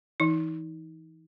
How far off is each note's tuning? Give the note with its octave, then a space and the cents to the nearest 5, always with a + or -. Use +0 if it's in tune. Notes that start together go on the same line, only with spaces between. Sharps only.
E3 +0 D#4 +30